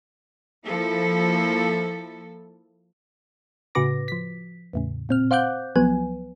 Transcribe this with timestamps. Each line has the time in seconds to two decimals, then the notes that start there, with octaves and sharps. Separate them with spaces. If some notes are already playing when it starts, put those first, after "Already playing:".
0.64 F3 A#3 E4 A4
3.75 A2 C#3 F#4 B4 D6 A#6
4.08 F3 B6
4.73 E2 A2 C#3
5.09 A#2 C4 F6
5.31 C5 F5 F#5 D6 F#6 G6
5.76 C2 F3 F#3 B3 B4 G#5